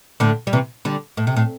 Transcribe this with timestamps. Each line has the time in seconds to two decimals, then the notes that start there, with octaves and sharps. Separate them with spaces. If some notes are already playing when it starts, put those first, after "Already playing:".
0.20 A2 D3
0.47 G3
0.53 C3 E3
0.85 D3 G3
1.17 A2
1.27 C3
1.36 A2